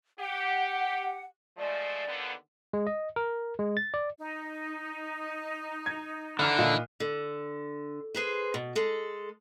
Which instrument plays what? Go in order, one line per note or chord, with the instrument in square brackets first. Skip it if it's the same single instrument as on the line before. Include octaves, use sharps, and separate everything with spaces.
[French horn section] G4 [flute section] F#5
[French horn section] F3 G#3 A3 [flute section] D5
[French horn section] D#2 D3 B3
[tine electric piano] G#3
D#5
A#4
G#3
A6
D5
[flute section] D#4
[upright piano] G#6
[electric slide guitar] D3 [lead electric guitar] E3 E4 [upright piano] A#5 F6 F#6
[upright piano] A#2 F4 D#5
[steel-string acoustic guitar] D3
G#4 B4 C5
B2
G#3 A4